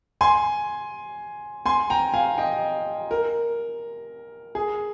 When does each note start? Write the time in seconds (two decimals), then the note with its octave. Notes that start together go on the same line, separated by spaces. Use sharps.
0.21 G#5 C6
1.66 G#5 C6
1.90 G5 A#5
2.14 F5 G#5
2.38 D#5 G5
3.11 A#4
4.55 G#4